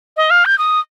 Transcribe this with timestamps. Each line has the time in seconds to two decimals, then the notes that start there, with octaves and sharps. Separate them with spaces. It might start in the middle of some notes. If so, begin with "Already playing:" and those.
0.17 D#5
0.30 F5
0.45 G6
0.58 D#6